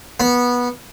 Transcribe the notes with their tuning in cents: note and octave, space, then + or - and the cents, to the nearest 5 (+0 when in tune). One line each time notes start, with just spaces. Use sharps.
B3 -15